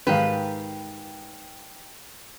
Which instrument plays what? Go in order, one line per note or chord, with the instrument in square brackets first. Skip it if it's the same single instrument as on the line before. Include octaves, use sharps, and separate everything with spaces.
[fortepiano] G#2 D#3 F5 [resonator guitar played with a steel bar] G4 B4